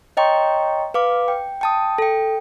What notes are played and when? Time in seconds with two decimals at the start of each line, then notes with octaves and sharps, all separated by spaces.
0.17 C#5 D#5 G5 A#5 C6 C#6
0.94 B4 F5 D6
1.28 G5
1.61 G5 A5 D#6
1.98 A4 G5